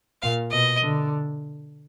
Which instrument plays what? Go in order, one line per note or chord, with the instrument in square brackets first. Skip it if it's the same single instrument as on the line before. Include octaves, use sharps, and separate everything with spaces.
[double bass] A#2 [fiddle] F5
[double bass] B2 [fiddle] D#5
[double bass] D3